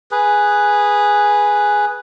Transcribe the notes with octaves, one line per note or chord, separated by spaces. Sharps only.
G#4 B4